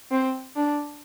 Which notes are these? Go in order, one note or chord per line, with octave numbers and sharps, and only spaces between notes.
C4
D4